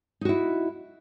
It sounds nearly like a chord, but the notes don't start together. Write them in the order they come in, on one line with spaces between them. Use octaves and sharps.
D#4 F#4 E4